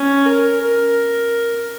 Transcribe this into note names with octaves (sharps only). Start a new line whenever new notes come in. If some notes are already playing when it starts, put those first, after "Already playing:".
Already playing: C#4
A#4
A#4